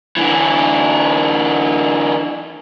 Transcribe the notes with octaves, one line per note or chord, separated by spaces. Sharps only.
D3 E3